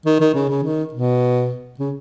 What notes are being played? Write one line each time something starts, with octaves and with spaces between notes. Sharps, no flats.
D#3
D#3
C#3
C#3
D#3
B2
C#3